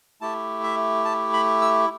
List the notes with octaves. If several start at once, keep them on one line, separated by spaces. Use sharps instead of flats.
A3 E4 G4 A5
E5
A5
B5
E6